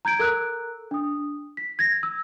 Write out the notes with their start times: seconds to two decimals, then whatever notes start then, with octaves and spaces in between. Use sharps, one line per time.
0.05 A#5 G6 G#6 D7
0.19 A4 A#4 A#5 E6 F#6
0.91 D4 D#6
1.57 B6
1.79 G#6 A#6
2.03 E6